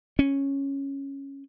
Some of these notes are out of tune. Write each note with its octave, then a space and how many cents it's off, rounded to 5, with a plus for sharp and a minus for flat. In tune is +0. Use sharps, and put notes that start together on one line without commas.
C#4 -5